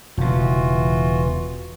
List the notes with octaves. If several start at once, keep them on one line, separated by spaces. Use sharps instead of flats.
E1 C#3 E3 F4 F#4